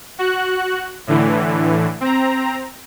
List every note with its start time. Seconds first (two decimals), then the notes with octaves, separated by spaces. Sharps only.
0.19 F#4 F#6
1.07 A2 D3 E3
2.01 C4 A#5